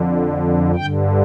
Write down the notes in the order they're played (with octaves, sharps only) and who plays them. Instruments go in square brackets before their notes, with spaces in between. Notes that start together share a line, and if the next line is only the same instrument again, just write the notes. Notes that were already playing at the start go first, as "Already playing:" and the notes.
Already playing: [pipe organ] F2 D3
G2 D3 G5